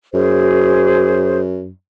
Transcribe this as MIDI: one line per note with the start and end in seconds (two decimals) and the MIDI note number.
0.14 1.70 42
0.14 1.39 66
0.14 1.39 68
0.14 1.39 72